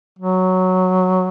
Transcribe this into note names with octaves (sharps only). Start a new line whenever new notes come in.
F#3